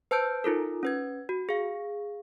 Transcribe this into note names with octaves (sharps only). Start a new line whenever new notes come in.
B4 C5 A5 E6 G6 D7
D#4 F4 A4 A#4
C#4 B4 G#6
F#4
G#4 F5